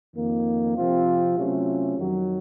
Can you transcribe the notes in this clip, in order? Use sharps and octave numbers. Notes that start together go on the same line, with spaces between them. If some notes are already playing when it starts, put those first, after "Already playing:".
F2 D#3 A#3
C3 F3 C4 F4
C3 F#3 A3 C#4 F4
F2 D#3 F#3